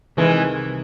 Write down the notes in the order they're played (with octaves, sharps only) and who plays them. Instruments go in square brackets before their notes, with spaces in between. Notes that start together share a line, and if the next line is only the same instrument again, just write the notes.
[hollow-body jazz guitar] C2 C3 D#3 [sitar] E3 G#3